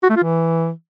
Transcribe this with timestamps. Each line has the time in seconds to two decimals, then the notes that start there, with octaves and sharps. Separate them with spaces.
0.03 F#4
0.10 A3
0.16 F4
0.23 E3